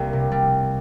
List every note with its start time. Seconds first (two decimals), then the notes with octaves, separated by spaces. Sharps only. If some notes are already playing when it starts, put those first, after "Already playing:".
Already playing: C2 G3 A#3
0.13 C3
0.32 G3